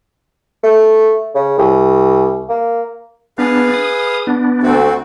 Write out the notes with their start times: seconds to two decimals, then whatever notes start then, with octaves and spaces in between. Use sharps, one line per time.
0.64 A3
1.35 C#3
1.58 C2
2.49 A#3
3.38 B3 D4 G#4 B4 F5
3.74 D#6
4.27 B3 D4
4.63 D2 A3 C4 F#4